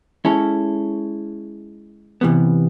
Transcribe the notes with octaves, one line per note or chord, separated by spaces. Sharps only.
G#3 C#4 E4 A4
C3 E3 G3 B3